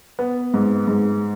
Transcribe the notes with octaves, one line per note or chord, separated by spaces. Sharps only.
B3
G#2
G#2